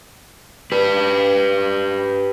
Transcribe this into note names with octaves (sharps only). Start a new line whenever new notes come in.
G4 B4